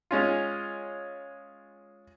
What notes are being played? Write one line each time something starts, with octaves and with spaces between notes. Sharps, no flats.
G#3 C#4 F4